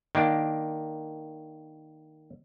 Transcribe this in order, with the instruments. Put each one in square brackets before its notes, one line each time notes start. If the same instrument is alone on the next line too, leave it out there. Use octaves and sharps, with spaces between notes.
[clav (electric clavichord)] D#3 A#3 D4